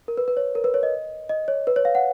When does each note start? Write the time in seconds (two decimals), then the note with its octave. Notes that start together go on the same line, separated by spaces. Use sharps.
0.08 A#4
0.17 B4
0.28 B4
0.37 C#5
0.55 A#4
0.64 B4
0.74 C#5
0.83 D#5
1.29 D#5
1.48 C#5
1.67 B4
1.76 C#5
1.85 F5
1.95 F#5